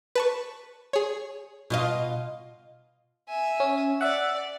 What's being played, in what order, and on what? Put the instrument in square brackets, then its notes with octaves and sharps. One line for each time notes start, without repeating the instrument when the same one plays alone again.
[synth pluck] B4 A5 C#6
G#4 C#5
[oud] B2 F4 D#5
[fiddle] E5 G#5
[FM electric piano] C#4
[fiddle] D5 [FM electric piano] E5 F#5